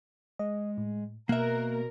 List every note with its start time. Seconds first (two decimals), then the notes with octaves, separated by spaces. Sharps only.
0.39 G#3 D#5
0.78 A2
1.29 B2 A#3 A#4 E5 F#6